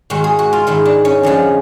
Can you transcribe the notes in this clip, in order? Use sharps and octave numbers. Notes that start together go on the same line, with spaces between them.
G#2 D#3 G#3 F#4
G#4
F#4
F4
G#2 D#3 G#3 E4
D4
C#4
F2 D3 F3 G#3